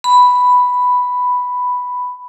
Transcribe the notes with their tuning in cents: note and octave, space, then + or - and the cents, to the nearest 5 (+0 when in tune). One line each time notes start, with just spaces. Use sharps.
B5 +5